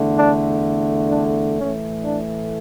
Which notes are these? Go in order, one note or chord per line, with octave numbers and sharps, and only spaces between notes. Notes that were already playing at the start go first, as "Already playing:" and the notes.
Already playing: E2 D3 A3
D4
D4
A2 E3 A3 C#4
D4